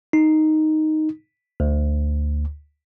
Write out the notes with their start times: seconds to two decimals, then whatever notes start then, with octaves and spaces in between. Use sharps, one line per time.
0.13 D#4
1.60 D2